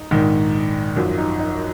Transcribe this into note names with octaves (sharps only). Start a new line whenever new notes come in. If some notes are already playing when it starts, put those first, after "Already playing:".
Already playing: D#4
A#1 G#2 D#3
G#1 F#2 F3
D#4
D#4